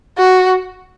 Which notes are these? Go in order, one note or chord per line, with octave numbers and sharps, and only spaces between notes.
F#4